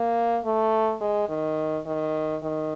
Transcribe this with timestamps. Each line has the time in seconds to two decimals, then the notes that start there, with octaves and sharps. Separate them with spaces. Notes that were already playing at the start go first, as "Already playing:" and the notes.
Already playing: A#3
0.45 A3
1.01 G#3
1.29 D#3
1.86 D#3
2.42 D#3